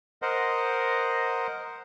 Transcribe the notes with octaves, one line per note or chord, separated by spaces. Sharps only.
A#4 C5 D#5 F#5